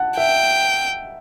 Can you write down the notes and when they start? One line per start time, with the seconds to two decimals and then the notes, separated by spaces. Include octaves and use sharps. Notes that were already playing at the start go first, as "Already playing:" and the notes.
Already playing: F#5 A5
0.17 E5 G5